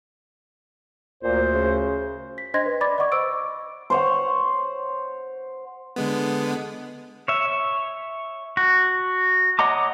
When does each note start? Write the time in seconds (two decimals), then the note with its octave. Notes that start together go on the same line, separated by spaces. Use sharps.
1.23 D2 A#2 C5
1.54 C#3
2.38 B6
2.54 D4 C5 D#5 C6 G#6 A#6
2.66 B4
2.81 D5 B5 D6 A6
2.98 D5 D#5 F#5 C#6 D6
3.12 C5 C#6 D6 E6 D7
3.90 C5 C#5 F#5
5.96 D3 G#3 B3
7.28 C#5 E5
8.57 F#4
9.59 C#5 D#5 F#5 A#5 D6